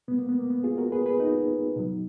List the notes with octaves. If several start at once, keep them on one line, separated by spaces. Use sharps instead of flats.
B2 G#3 B3
A#3
B3
A#3
B3
F4 G#4
F#4 A#4
G#4 B4
G#4 B4
D#4 F#4
B2 F#3